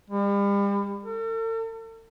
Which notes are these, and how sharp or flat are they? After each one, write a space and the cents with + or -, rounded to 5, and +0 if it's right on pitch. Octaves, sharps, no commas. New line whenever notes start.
G3 +40
A4 +45